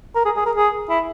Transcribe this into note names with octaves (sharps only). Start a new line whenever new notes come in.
A#4
G#4
G#4
A#4
G#4
E4